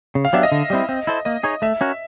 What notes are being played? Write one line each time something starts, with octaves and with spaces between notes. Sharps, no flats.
C#3
F5
F#3 B3 D4 G4 E5
D#5
D3
G3 C4 E4
C4
E4 A4 C5
A#3 D#5
D#4 G#4 C#5
A3 E5
C#4 F#4 A#4